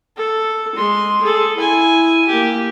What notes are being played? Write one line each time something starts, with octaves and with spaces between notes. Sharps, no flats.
A4
G#3 C6
G#4 A4
E4 G#5
A#3 G4